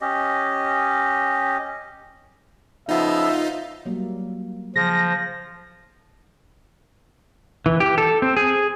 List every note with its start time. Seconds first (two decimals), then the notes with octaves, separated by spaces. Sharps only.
0.01 C#4 G4 D#5
2.89 C#3 F3 B3 D#4 F4 E5
3.86 F#3 G3 A#3
4.76 C#3 F3 G#4 A#6
7.66 E3
7.80 G4
7.98 A4
8.22 C4
8.37 G#4